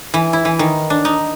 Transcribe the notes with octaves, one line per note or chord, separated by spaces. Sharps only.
E3
E4
E3
D#3
D4
D#4